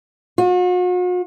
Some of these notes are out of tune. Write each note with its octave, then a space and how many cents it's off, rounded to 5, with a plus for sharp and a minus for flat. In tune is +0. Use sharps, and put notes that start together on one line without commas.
F#4 -45